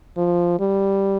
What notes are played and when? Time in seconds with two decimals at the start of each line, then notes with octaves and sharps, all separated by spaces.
0.17 F3
0.59 G3